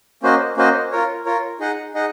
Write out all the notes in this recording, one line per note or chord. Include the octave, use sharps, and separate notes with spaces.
A#3 C#4 F#4 C5 D#5
A#3 C#4 F#4 C5 D#5
F4 A#4 C#5
F4 A#4 C#5
D#4 G#4 D#5 F#5
D#4 G#4 D#5 F#5